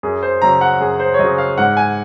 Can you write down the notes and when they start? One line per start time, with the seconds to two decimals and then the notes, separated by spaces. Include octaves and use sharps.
0.03 F#2 G#4
0.23 C5
0.42 C#3 F#3 A#5
0.61 F#5
0.81 F#2 G#4
1.00 C5
1.14 C#5
1.19 C#3 F#3 D#5
1.38 F5
1.58 G#2 F#5
1.77 G#5